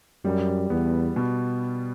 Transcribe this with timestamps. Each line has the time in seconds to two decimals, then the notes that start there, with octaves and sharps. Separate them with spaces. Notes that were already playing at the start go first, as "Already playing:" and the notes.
0.25 F#2 G3
0.70 E2 B3
1.16 B2